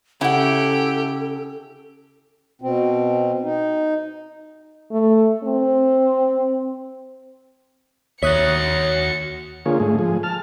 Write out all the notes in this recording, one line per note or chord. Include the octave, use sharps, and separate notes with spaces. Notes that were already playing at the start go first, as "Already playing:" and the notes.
C#3 E4 G4 A4 F#5
B2 C4
D#4
A3
C4
D#2 F#4 C#5 E5 D#6 F#6 C#7
D3 A#3 F4 G#4 C#5
G#2 A3 G#4
F3 G#4
A5 F6